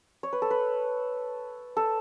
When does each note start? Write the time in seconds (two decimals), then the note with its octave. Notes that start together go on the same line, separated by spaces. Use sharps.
0.23 C#5
0.33 B4
0.42 A4
0.51 B4
1.77 A4